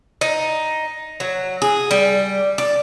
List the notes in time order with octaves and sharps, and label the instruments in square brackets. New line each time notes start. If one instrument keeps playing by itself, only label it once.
[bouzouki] D#4
F#3
G#4
G3
D5